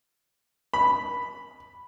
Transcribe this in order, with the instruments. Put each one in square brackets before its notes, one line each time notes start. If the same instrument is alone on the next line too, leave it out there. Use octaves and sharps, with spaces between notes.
[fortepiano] B5